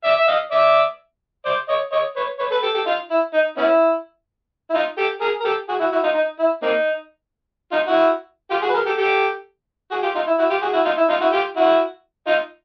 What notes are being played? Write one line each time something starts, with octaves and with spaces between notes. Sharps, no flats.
D5 E5
E5
D#5 F5
D5 E5
C5 D5
C#5 D#5
C#5 D#5
B4 C#5
B4 C#5
A4 B4
G4 A4
G4 A4
D#4 F4
E4
D#4
B3 C#4 E4
E4
D#4 F4
G4 A4
G#4 A#4
A#4
G4 A4
F#4 G#4
E4 F#4
E4 F#4
D#4 F4
D#4
E4
A#3 C4 D#4
D#4 F4
E4 F#4
F4 G4
F#4 G#4
B4
G#4 A#4
G4 A4
G4 A4
F#4 G#4
F4 G4
D#4 F4
E4
E4 F#4
F4 G4
F#4 G#4
E4 F#4
D#4 F4
E4
D#4 F4
E4 F#4
F4 G4
E4 F#4
D#4 F4